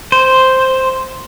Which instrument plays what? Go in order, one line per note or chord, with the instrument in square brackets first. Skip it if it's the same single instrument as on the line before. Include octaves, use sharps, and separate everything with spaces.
[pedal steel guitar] C5